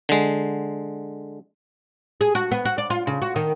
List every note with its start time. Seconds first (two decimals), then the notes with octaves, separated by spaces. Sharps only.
0.09 D3 G#3
2.21 G#4
2.35 F#4
2.51 B3
2.65 F#4
2.78 D5
2.90 F4
3.07 C#3
3.22 F#4
3.36 D#3